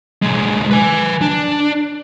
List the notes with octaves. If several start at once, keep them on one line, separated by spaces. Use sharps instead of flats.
B1 G#3
B4 G#5
D4